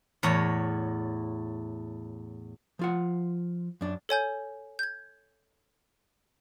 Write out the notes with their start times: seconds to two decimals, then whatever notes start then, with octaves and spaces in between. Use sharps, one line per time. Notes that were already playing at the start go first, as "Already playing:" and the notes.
0.23 E2 A2 C#5 A#5
2.79 F3 F4 F#5
3.81 F#2 D4
4.09 A4 C#5 G#5 G6
4.79 G6 G#6